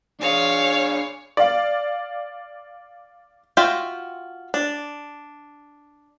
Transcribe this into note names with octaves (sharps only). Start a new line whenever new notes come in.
D4 G#4 C#5 F5
D5 F5
F4 F#4 E5 G5
D4